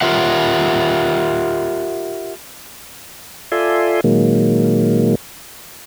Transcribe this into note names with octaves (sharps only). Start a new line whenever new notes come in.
F4 G4 A#4 E5 F#5
F4 A4 D5 E5 G#5 C6
A#2 D#3 F#3 G#3 A#3